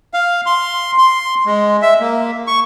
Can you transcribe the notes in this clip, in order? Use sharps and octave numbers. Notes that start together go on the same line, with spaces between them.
F5
C6
C6
G#3
E5
A#3
C#6